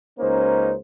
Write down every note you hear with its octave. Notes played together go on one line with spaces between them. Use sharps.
C#2 A#3 C#4 D#4 C5